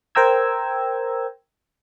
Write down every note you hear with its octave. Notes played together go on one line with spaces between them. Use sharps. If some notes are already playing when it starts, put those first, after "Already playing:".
A#4 C5 G5 A#5 E6 G#6